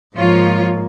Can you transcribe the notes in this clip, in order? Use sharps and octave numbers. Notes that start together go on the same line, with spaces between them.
G#2 F3 A#3 F4 C#5